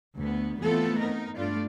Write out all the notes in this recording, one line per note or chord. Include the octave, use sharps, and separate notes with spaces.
D2 B3
E3 A3 B3 C4 F4 A4
D#4 A#4
G2 A3 D4 F4 D5